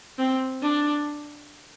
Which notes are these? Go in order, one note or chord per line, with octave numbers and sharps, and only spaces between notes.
C4
D4